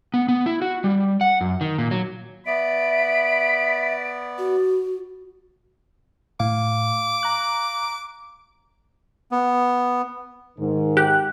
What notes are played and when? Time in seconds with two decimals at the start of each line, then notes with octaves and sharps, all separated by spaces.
0.14 B3
0.29 B3
0.46 E4
0.62 F#4
0.84 G3
1.21 F#5
1.41 F#2
1.61 D#3
1.78 A#2
1.91 F#3
2.46 B3 D5 E5 B5 D7
4.38 F#4
6.40 A2 F5 D6
7.23 A#5 F#6
9.32 B3
10.58 G#2 D#3
10.97 G4 F#6